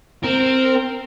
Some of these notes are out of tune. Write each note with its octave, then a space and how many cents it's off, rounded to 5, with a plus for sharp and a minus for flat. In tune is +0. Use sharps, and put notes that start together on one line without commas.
C4 +0 A#4 -10